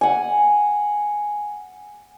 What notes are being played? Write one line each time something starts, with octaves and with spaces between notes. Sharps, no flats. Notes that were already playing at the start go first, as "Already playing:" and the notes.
F#5 G#5